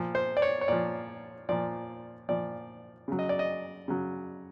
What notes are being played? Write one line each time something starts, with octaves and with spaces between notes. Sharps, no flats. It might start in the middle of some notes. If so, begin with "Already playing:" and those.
Already playing: A#2 F3
C5
D5
C#5
C#5
A#2 F3 D5
A#2 F3 D5
A#2 F3 D5
C#3 F#3
D#5
D5
D#5
C#3 F#3